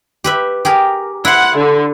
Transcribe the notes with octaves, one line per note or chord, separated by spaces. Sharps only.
G4 B4 E5
G4 G#4 A#4
E4 C5 F#5
D3